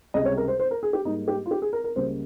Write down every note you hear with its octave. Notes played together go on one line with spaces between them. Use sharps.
C#2 C3 G3 D#5
C#5
A#4
C5
C5
A#4
G#4
G4
G#2 G3 A#3 D#4
G4
F4
G4
G#4
A#4
A#4
C#2 C#3 G3 A#3 C5